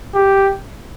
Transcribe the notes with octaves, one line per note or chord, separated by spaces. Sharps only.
G4